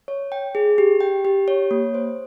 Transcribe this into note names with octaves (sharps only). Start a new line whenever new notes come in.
C#5
G5
G#4
G4
G5
G4
C#5
A#3
C5